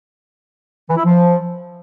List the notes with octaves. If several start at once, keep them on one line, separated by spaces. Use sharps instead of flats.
E3
E4
F3